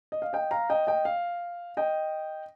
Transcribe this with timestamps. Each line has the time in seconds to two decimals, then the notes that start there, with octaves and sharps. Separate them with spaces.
0.12 D#5
0.22 F5
0.33 D#5 G5
0.51 F5 A#5
0.70 D#5 G5
0.87 D#5 G5
1.05 F5
1.77 D#5 G5